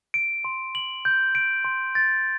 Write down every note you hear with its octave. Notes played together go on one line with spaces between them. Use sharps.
D7
C6
F#7
G6
D7
C6
A6